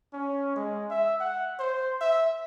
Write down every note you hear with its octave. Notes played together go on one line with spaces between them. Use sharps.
C#4
G#3
E5
F#5
C5
E5